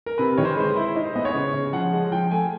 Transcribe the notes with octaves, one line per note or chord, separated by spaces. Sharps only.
A#4
C3 B4
D#3 C#5
C5
B4
G#3 C5
E4
D#4
C5
B3 D#5
C#5
C#3
C#3
F3 F#5
G#3
F3 G5
A3 G#5